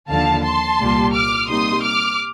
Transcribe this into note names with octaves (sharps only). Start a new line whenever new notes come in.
D#2 D3 F3 F5 A5
A5 C6
C2 A#2 G3 A#3
D6 F6
C3 G3 A#3 D#4 C6 D#6
D6 F6